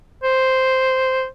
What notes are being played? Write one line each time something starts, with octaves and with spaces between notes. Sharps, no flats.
C5